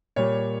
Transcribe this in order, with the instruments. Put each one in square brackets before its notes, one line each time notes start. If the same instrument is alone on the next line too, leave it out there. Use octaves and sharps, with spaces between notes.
[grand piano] A#2 G3 C#5